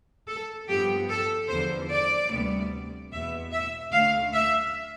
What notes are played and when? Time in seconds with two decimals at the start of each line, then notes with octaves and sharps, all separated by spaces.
0.28 A4
0.69 G2 F3 B3 G4
1.10 A4
1.49 E2 D3 F3 C5
1.91 D5
2.30 D2 C3 G3 B3
3.12 E2 B2 B3 E5
3.52 E5
3.93 D2 D3 A3 F5
4.33 E5